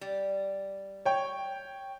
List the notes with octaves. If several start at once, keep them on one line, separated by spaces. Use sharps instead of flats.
G3
C#5 G5